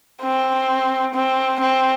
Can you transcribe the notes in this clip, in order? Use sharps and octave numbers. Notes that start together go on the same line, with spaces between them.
C4
C4
C4